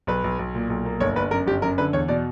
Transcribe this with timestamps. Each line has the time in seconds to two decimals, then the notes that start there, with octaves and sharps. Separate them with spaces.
0.07 B1 B4
0.24 B1
0.39 B1
0.55 A#2
0.70 B1
0.85 A#3
1.00 G1 C#5
1.16 G1 B4
1.31 F#2 A#4
1.46 G1 G4
1.62 F#2 A#4
1.78 D3 B4
1.93 E2 C#5
2.08 B2 D5